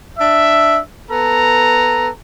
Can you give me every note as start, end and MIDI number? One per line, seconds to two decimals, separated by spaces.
0.19 0.80 62
0.19 0.80 76
1.11 2.10 59
1.11 2.10 69
1.11 2.10 82